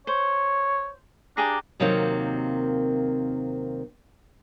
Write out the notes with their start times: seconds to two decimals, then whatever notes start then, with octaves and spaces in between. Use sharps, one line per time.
0.07 C5 C#5
1.37 D4 G4 G#4 A#5
1.80 D#2 C3 D#3 F#3 A#3 C4